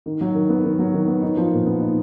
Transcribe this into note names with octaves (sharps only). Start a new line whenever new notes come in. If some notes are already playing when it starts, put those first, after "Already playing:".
D#3
F#3
D#3
B3
D#3
F#3
D#3
B3
D#4
F3
A#2
B3
D#4